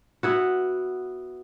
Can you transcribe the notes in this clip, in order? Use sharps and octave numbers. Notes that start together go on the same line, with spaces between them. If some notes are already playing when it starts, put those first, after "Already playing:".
B3 E4 F#4